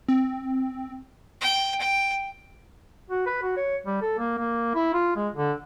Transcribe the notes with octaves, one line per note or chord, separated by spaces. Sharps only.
C4
G5
G5
F#4
B4
F#4
C#5
G3
A4
A#3
A#3
E4
F4
G#3
D3